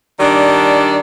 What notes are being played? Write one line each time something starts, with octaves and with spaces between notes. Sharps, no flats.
D#3 G3 D4